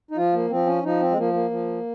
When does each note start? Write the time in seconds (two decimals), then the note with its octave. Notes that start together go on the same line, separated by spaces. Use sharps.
0.11 D#4
0.17 F3 F4
0.34 A#3
0.50 F3 C4
0.66 C#4
0.83 F3 D#4
1.00 C4
1.11 G#3
1.17 F3 A#3
1.33 A#3
1.50 F3